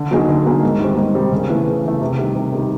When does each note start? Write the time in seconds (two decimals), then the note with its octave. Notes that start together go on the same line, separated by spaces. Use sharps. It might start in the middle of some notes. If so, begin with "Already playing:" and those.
Already playing: D3
0.11 F#3 A#3 D#4 G#4
0.28 D3
0.45 F#3 A#3 D#4 G#4
0.63 G#2
0.80 D#3 G3 C4
0.97 G#2
1.15 D#3 G3 C4
1.32 C#3
1.49 E3 A3
1.67 C#3
1.83 E3 A3
2.01 C3
2.19 D#3 G3
2.35 C3
2.53 D#3 G3